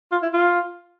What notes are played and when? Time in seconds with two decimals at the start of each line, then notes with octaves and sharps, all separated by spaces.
0.12 F4
0.22 E4
0.33 F4